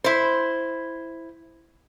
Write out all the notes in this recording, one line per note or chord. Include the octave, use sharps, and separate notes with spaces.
E4 C5